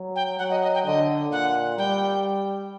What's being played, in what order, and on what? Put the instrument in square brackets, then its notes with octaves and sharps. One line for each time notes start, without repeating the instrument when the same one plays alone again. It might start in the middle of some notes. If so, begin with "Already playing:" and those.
Already playing: [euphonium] F#3
[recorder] G5
[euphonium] F#3 [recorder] F#5
[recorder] D#5
D#5
G5
[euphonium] D3 [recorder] D#5
[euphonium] A#2 [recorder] F#5
[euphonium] G3 [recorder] G5